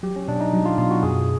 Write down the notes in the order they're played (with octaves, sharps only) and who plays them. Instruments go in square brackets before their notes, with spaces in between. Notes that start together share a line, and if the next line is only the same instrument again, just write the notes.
[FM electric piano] F#3 [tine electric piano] G4
[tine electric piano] C#4
[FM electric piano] B2 [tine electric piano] D4
[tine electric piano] D#4
[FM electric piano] F#3
[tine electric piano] F4
[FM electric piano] B2 [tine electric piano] F4
[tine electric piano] F#4
[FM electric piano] F#2 [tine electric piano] G#4